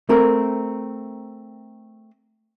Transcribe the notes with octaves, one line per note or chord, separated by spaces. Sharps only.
A3 C4 A#4